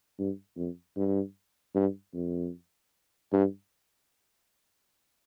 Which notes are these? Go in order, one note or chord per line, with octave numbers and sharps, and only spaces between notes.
G2
F2
G2
G2
F2
G2